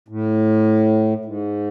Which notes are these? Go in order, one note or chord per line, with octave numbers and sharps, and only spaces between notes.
A2
G#2